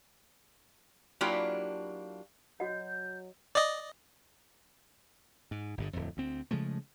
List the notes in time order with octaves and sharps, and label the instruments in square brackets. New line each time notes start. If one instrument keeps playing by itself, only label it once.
[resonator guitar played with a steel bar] F#3 A#3 D4 E4 F4 G4
[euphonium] F#3 [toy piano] F#4 D#5 F#5 [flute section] G6
[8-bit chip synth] D5 D#5
[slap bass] G#2
G1 G2 D3
D1 F2
D2 C4
C#3 F3 G#3 A3